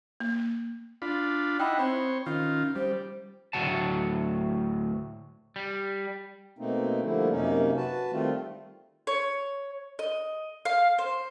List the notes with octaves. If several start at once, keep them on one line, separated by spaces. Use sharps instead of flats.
A#3
D4 F4 B5
D#4 E4 D#5 F#5 G5 B5
C4 C5 C#5 B5
D#3 C#4 F4
G3 C5
D2 A2 F3 F#3 F#5 A5
G3
B2 A3 A#3 C4 D#4
D3 F3 G3 A3 A#3 E4
F#2 C3 A#3 C#4 D#4
F#4 B4 A5
D#3 G3 A3 C4 F4
C#5
D#5
F5
C5